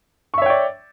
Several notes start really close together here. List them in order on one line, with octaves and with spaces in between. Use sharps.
C#6 E5 C#5 G5 D5